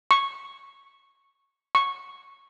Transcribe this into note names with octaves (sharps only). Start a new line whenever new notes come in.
C#6
C#6